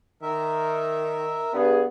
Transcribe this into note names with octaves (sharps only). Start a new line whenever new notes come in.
D#3 A#4 E5
G2 B3 G#4